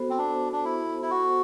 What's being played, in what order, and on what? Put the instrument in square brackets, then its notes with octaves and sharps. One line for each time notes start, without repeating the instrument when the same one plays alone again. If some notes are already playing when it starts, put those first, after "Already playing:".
Already playing: [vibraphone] B3 F#4 A4 C5
[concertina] C4
D4
D4
E4
E4
F#4